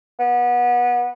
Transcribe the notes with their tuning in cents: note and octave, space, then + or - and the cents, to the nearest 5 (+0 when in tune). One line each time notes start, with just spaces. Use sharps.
B3 -25